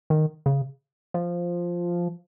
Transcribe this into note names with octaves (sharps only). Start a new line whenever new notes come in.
D#3
C#3
F3